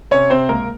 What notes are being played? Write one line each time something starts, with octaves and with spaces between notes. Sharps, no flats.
C3 C#4 C#5
C3 C4 C5
C#2 A#3 A#4